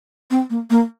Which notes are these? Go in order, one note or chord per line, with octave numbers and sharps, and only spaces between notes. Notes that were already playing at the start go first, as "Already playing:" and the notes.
C4
A#3
A#3